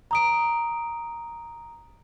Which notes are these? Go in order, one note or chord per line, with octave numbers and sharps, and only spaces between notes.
A#5 D#6 D7